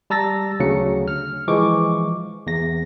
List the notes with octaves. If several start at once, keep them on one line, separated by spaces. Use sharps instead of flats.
G3 A5 A#5 E6 A6 A#6
D2 C#3 F#3 D4 C#7
F6
E3 F3 G#3 C#6 D6
E2 A#6